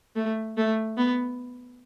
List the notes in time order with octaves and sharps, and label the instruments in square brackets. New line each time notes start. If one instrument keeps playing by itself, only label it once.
[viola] A3
A3
B3